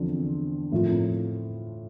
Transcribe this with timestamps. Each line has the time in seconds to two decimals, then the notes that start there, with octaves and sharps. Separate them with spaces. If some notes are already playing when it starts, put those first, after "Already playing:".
Already playing: E2 D3 F3 C4
0.72 A2 F3 C4 F4